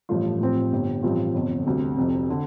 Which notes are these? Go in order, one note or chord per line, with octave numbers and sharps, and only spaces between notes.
A1 G2 F3 A3 F4
A2 F3 C4 G4
G1 G2 G3
A1 G2 F3 C4 F4
G1 F2 D3
D2 C3 G3
F1 F2 C3
D3